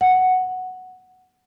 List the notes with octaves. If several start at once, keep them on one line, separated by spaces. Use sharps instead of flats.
F#5